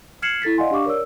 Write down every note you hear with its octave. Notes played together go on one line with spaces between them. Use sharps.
F6 G#6 C7 C#7 E7 F#7
E4 A4 A6 B6
D5 D#5 F5 F#5 G#5 C6
D4 G4 D5 F5 C#6 D6
A#4 C#5 D5 E6